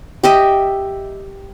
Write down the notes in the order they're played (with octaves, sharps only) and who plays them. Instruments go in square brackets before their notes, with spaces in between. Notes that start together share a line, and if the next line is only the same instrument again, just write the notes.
[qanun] G4 D#5 E5